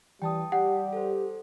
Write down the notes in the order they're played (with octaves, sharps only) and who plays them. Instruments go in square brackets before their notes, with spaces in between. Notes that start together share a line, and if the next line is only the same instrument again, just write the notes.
[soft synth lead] E3 [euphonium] G3 [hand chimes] G5 A5 D#6
[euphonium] G3 [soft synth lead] G4 [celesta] F#5
[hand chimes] A4 C5